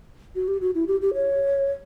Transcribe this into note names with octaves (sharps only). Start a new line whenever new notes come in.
F#4
G4
F#4
E4
G4
G4
C#5